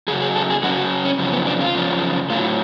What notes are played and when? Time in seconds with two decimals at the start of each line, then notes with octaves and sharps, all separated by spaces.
0.08 F#2 C#3 F#3 G#4
0.22 G#4
0.36 A4
0.50 G#4
0.63 F#2 C#3 F#3 F#4
0.78 F#4
1.05 C#4
1.19 F#2 C#3 F3
1.33 B3
1.47 D4
1.61 F4
1.75 F#2 C#3 F3
2.30 A2 F4
2.33 F#3